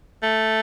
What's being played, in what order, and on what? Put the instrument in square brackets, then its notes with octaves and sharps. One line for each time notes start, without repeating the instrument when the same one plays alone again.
[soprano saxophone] A3